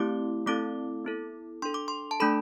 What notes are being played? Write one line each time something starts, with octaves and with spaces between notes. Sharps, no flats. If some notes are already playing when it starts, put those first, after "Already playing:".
Already playing: A3 C4 E4 G4 D6
A3 C4 E4 A4 D6
B3 E4 A4
D4 A4 C6
D6
C6
A5
A3 D4 A4 B5